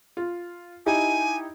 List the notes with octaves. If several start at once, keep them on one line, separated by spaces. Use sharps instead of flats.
F4
D#4 E4 G4 G#5